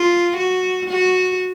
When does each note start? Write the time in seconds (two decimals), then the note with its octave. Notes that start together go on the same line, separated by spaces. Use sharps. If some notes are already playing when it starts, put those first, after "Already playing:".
Already playing: F4
0.37 F#4
0.90 F#4